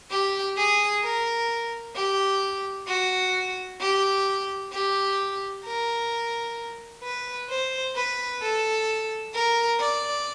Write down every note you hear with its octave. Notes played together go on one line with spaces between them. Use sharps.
G4
G#4
A#4
G4
F#4
G4
G4
A#4
B4
C5
B4
A4
A#4
D5